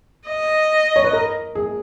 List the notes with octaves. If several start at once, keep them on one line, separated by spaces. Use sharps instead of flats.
D#5
C#5
B4
A#4
G#4